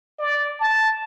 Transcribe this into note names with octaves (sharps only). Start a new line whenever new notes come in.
D5
A5